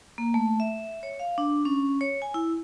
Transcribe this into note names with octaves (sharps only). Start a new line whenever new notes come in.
A#3
A3
E5
C#5
F5
D4
C#4
C#5
G#5
E4